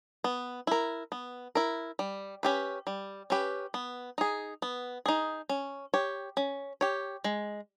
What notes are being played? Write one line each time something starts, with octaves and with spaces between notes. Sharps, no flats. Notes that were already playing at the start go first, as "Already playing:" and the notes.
B3
E4 A#4
B3
E4 A#4
G3
C#4 G4 B4
G3
C#4 G4 B4
B3
D#4 G#4
B3
D#4 G#4
C#4
G4 C#5
C#4
G4 C#5
G#3